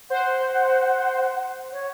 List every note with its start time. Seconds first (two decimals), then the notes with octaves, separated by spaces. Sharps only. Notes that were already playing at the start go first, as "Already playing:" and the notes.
0.10 C5 F#5
1.72 C#5